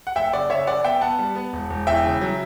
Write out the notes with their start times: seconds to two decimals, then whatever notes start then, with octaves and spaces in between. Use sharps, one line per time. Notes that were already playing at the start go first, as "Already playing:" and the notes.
0.07 F#5
0.16 F#1 E5 G5
0.33 C#3 D5 F#5
0.50 C#3 C#5 E5
0.67 F#2 D5 F#5
0.84 B3 E5 G5
1.01 B3 F#5 A5
1.18 G3
1.35 B3
1.53 E1
1.70 E1
1.87 E2 E5 G5
2.04 C#3
2.21 F#3